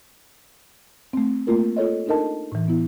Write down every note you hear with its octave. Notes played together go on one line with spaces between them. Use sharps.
A3 C4
A3 A#3 F4 A#4
F4 A4 C#5 D#5
D4 D#4 A4 A#4 D#5 A5
A2 E3
B3 E4